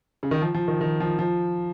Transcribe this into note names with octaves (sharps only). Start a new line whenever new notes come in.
C#3
D#3
F3
F3
D#3
D#3
F3
F3